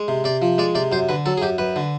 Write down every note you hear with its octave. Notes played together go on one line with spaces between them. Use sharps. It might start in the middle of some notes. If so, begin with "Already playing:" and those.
Already playing: G#3
C3
C3 D5
F3
G#3 D5
C3 D5
F#2 C5
D3 B4
F#3 A4
G#4
F#2 G4
F#2 B4
D3